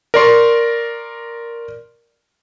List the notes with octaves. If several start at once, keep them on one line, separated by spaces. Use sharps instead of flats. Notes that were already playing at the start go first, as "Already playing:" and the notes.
A#4 D5 C6 C#6